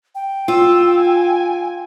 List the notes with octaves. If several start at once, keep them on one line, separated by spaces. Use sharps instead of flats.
G5
F4 E6
G#5